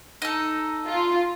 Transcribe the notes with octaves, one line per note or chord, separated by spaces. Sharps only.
D#4 A4
F4